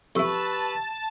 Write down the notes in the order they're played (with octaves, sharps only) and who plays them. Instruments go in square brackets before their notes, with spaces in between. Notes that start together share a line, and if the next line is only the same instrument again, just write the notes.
[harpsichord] F2 E4 [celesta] G4 C#6 E6 [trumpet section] B4 [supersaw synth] A5